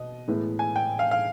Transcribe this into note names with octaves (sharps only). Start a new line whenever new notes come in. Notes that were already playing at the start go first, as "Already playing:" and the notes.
Already playing: B2 D#5
A2 E3 G#3 B3
G#5
G5
F5
F5